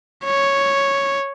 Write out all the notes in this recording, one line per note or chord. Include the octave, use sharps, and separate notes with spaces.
C#5